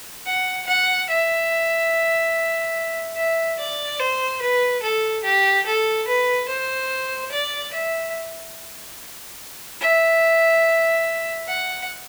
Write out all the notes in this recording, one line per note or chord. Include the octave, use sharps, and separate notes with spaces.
F#5
F#5
E5
E5
D5
C5
B4
A4
G4
A4
B4
C5
D5
E5
E5
F#5